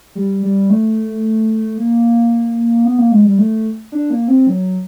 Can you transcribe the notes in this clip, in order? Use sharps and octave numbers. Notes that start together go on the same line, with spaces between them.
G3
G3
A3
A#3
B3
A#3
G#3
G3
A3
D4
A#3
C4
F#3